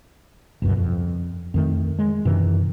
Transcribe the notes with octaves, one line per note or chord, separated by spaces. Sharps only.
G1 C#2 F#2 B2
F2
F2 D#3 A3
G#3
F#2 C3 D#3 E3